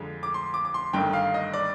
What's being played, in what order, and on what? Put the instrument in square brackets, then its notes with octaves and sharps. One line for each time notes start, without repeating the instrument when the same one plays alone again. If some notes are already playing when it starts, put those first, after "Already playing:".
Already playing: [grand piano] F2 D3 G#3
D6
C6
D6
D6
C6
G1 G2 D#3 G5
F5
D#5
D5